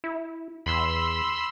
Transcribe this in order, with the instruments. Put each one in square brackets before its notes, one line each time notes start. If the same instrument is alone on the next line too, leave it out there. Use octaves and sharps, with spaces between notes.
[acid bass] E4
[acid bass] E2 [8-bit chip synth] B5 C6 E6